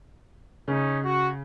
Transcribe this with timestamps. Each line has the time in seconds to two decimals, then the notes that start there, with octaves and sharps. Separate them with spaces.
0.68 C#3 C#4 D#4
1.05 F#4